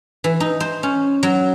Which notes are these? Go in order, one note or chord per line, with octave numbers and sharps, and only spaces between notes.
E3
D#4
C5
C#4
F#3